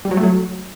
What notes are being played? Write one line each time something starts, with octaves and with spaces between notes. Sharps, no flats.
G3
F#3
A3
F#3